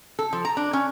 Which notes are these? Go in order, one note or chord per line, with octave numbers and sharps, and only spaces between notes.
A4
F3
A#5
D4
C#4